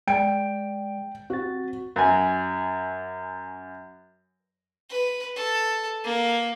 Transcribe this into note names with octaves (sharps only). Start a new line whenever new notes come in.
G#3 D5 G5 D7
C4 F#4 A6
F#2 G#5
B4
A4
A#3